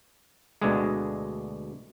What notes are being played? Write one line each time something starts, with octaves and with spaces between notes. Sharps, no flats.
D2 B2 D3 G#3